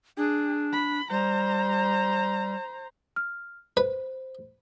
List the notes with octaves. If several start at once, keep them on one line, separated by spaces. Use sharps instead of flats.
D4 G#4
B5
G3 C5 A#5
F6
B4 C5